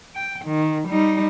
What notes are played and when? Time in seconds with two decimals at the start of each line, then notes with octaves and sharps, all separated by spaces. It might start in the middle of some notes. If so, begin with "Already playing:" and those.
0.15 G5
0.46 D#3
0.89 G3 D#4